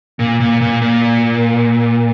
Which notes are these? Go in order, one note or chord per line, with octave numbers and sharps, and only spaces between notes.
A#2
A#2
A#2
A#2